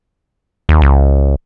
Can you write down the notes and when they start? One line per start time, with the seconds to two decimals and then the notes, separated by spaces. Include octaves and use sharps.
0.69 D#2
0.82 C#2